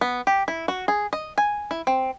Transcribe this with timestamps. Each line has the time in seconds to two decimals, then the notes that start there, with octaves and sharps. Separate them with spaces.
0.01 B3
0.27 G4
0.48 E4
0.68 F#4
0.88 G#4
1.13 D#5
1.38 G#5
1.71 E4
1.87 C4